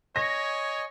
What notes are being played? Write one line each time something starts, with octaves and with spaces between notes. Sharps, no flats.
C#5 D#5 G#5 A#6